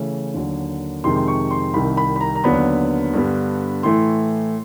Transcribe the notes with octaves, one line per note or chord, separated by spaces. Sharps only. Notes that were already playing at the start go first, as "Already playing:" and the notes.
Already playing: C#3 E3 A3 C#4
D#2 D3 F#3
F2 C3 D#3 G#3 C6
C6
C#6
C6
C2 C3 D#3 B5
B5
B5
A#5
A#5
D#2 D3 F#3 B3 D4 B5
G2 D3 G3 B3
A2 E3 A3 C6